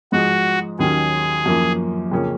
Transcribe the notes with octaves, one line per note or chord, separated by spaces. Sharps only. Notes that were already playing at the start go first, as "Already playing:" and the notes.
G#2 F3 G#3 F#4
D#2 D#3 F#3 C#4 G#4
F#2 F3 A#3
F2 C#3 F3 A#3 C#4